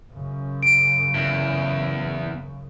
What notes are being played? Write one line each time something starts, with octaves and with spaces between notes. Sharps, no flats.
F#2 C#3
D7
E2